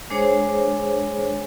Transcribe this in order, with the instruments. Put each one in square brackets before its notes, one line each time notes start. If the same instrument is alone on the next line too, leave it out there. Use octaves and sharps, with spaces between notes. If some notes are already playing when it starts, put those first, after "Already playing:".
[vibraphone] G#3 D4 G#4 C5 C#5